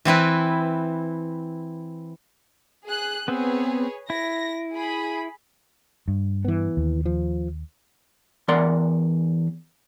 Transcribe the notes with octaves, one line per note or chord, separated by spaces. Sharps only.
E3 C4 E4 B4
G#4 F#6
B3 C4 G#4 B4 C#5
E4 A#6
G#4 B5
G2
E3 B3
D#2
F3
E2 A#4 D5 F#5 C6